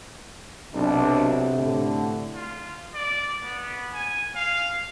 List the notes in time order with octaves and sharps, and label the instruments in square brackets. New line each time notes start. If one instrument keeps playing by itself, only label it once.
[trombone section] B1 D4 [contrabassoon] C3
[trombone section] A2 D3
[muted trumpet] F4
D5
B3
G#5
F5